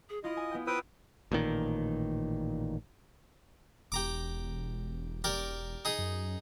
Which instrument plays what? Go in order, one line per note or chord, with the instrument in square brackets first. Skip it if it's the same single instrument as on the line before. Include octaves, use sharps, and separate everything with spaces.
[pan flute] G#4
[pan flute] E4 [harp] F4 D#6 [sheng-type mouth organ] D#5
[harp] G#5
B3 G5
[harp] F4 C5 E6 [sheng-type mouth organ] B4 G5 D#6
[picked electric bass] A1 A#2 D#3
[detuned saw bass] E1 [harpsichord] G4 A#5 D6
[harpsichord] G4 A#4 D5
D#4 G#4 D#6
[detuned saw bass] F#2